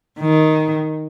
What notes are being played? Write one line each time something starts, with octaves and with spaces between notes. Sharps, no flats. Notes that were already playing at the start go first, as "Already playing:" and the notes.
D#3